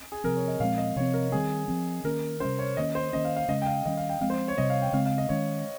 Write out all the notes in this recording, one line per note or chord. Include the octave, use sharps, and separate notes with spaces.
G#4
C3 F3 C4 A#4
C#5
D#5
A#2 F3 G#3 C4 F5
D#5
C3 F3 C4 C#5
A#4
D#3 G3 C4 G#4
F3 C4
D#3 A#3 C#4 A#4
C3 G3 A#3 C#4 C5
C#5
D#3 A#3 C#4 D#5
C5
D#3 A#3 C#4 D#5
F5
F5
C#3 G#3 C#4 D#5
G5
F5
D#3 G3 C#4 D#5
F5
G5
F3 G#3 C4 F5
C5
C#5
C3 G3 C4 D#5
F5
G5
C#3 G#3 C4 F5
F5
D#5
D#3 G#3 C#4 C#5